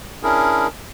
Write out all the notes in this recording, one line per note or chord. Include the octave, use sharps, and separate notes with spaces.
C#4 D4 E4 G#4 A#4